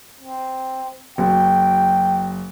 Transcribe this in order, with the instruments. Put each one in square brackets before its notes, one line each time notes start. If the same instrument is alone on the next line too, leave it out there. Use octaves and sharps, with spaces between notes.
[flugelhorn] C4
[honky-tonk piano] F#1 [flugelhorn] G5